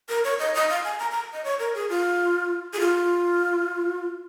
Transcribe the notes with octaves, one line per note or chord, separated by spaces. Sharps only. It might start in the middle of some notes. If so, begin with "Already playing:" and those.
A#4
C#5
D#5
D#5
F5
G#5
A#5
A#5
D#5
C#5
A#4
G#4
F4
G#4
F4